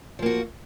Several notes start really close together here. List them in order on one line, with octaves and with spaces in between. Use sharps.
F3 A#3 F#4